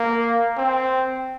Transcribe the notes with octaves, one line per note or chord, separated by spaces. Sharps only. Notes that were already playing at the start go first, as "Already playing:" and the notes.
Already playing: A#3
C4